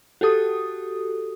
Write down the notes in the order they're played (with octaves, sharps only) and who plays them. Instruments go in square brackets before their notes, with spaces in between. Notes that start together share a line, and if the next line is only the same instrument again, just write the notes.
[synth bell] F#4 G4 A4 D#6